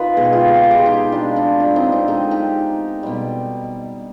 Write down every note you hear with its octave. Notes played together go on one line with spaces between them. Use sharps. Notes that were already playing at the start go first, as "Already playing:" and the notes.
Already playing: D#3 D#4 F4 B4
B2 G#3 G#4
G4
F4 G#4
G4
G#4
G4
G#4
G4
G#4
D#4 G4
B2 G#3 D4 F4
D4
D4
C4 D#4
C4 D#4
D3 G#3 D#4 G4
D#4 G4
B2 G3